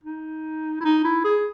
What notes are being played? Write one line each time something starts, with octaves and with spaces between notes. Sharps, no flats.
D#4
E4
D#4
E4
G#4